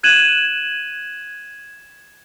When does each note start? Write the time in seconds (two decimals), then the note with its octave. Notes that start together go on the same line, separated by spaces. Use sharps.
0.03 F#6 G#6 D#7 E7 F#7